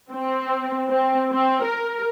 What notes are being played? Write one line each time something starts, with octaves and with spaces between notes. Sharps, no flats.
C4
C4
C4
A#4